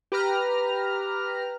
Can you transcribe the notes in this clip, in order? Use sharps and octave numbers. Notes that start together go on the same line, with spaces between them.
G4 B4 A#5 F6